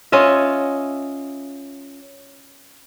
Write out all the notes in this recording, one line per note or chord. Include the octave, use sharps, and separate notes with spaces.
C#4 F4 D#5 E5